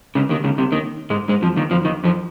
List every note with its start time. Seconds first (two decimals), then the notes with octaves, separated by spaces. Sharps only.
0.15 C#2 C#3
0.29 D#2 D#3
0.44 C#2 C#3
0.58 C2 C3
0.72 D#2 D#3
1.10 G#2 G#3
1.29 G#2 G#3
1.42 F2 F3
1.57 D#2 D#3
1.71 F2 F3
1.85 D#2 D#3
2.04 F2 F3